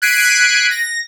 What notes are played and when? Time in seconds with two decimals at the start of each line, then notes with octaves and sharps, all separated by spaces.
0.02 F#6 G#6 B6 C7 D7 D#7
0.71 A#6